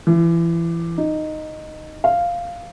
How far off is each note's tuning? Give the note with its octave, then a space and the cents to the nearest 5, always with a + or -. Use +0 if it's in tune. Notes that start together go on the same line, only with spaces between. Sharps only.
E3 +30
D#4 -5
F5 -5